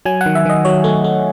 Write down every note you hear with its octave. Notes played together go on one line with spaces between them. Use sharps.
F#3 G#5
F#5
D#3
E5
D#3 D#5
F#3 C#5
A3
A3